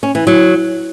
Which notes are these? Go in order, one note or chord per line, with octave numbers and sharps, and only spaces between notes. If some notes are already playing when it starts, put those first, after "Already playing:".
C#4
E3
F#3